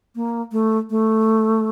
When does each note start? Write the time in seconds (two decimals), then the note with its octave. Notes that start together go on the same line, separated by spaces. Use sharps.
0.16 A#3
0.52 A3
0.90 A3